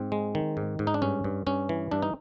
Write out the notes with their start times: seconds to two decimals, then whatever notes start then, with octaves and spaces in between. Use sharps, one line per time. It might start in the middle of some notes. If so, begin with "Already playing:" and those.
Already playing: G#2 C4
0.12 G#3
0.35 D#3
0.57 G#2
0.79 G#2
0.87 D#4
0.94 D4
1.02 G2 C#4
1.24 G2
1.46 G2 C#4
1.69 E3
1.91 G2 D4
2.02 D#4